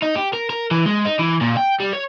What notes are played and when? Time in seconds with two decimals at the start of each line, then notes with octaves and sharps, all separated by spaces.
0.03 D#4
0.16 G4
0.33 A#4
0.50 A#4
0.71 E3
0.86 G#3
1.05 D#4
1.19 E3
1.41 A#2
1.57 G5
1.80 G3
1.93 C#5